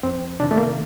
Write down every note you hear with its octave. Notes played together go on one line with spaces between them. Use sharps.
F2 C4
C3 D#3 D4
A3
A#3